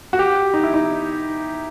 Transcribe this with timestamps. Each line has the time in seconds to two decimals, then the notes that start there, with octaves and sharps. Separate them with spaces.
0.13 F#4
0.19 G4
0.54 D#4
0.63 E4
0.74 D#4